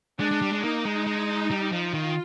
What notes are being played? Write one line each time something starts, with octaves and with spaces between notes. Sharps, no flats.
G#3 D4
G#3
G3
G#3
A#3 D#4
G#3
G#3
G3
F3
D#3 F4